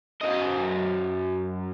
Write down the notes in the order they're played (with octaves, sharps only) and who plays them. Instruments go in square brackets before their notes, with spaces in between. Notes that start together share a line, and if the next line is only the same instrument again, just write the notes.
[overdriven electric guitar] F#2 D#5